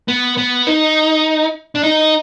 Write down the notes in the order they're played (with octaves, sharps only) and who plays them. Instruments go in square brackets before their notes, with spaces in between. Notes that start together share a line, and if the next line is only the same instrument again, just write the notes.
[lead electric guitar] B3
B3
D#4
D4
D#4